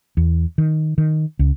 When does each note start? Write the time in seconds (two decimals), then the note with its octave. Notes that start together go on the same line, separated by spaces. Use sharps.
0.17 E2
0.58 D#3
0.98 D#3
1.39 C#2